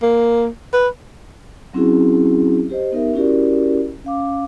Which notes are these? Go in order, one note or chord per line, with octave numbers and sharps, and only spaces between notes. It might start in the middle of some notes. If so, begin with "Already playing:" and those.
A#3
B4
F#3 C4 C#4 E4 F#4 G#4
G4 C5 D#5
B3 D#4 G4 A#4 E5
C#4 E4 F#4 G4 A#4 D5
C#4 F5 D6